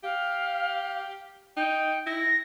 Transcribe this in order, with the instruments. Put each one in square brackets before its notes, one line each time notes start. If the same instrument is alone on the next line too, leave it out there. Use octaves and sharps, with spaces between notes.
[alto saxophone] G4 [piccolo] F5
[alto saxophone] D#4 [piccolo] G5
[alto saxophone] E4 [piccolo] A#6